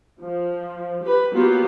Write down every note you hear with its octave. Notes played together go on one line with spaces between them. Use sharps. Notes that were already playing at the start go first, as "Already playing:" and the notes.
F3
G4 B4
F#3 A#3 B3 F4 G4